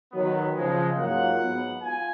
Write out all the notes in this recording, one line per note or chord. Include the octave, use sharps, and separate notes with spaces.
D#3 F#3 B3
C#3 F3 G#3
G#2 F#3 A#3 F4 F#5
G#2 F#3 B3
F4 G#5